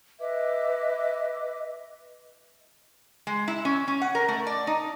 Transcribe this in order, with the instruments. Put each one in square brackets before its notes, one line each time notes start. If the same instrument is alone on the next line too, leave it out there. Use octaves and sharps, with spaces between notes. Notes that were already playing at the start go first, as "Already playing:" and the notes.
[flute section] B4 D#5 E5 D6
[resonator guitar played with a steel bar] G#3
E4
C#4
C#4
F#5
A#4
A3
D5
D#4